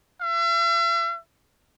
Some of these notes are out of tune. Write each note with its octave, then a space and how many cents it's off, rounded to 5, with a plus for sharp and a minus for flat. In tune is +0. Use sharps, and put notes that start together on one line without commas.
E5 +45